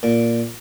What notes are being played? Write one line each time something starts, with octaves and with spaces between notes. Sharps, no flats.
A#2